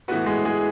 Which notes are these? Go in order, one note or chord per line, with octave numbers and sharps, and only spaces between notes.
A2 E3 B3 F#4 B4
G#3 G#4
G#3 G#4